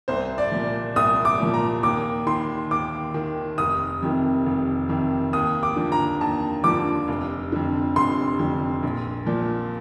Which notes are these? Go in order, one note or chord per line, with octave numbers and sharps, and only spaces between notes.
C2 C5
D5
A#2 F3
C2 D#6
D6
A#2 F3
A#5
D#2 D6
D#3 C6
D#2 D6
D#3
F1 D#6
F2 C3 D#3
F1
F2 C3 D#3
D#2 D#6
D6
D3 F3
A#5
D#2 A5
D3 F3 D6
F1
F2 D3
F1 C6
F2 D3
A#1
A#2 F3